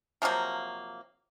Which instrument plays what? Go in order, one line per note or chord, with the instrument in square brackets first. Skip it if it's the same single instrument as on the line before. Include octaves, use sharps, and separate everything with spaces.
[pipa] C3 F3 F#3 A#3